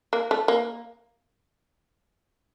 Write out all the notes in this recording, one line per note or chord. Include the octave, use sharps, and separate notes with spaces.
A#3
A3
A#3